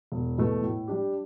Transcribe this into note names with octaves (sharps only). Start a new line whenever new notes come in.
E1
E2 B2 A3
A2
G3 D4 G4